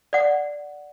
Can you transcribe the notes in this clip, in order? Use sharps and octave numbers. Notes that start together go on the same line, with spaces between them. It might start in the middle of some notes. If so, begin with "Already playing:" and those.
D5 F#5